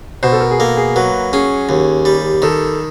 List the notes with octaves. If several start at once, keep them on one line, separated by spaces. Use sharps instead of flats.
B2 C5
A4
A#4
G#4
A#3 A4
G#4
F#3 B4
C#4 G#4
D#2
G3
D#3 A4